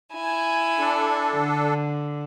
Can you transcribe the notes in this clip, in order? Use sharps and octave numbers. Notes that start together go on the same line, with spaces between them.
E4 G#5
D4 A4
D3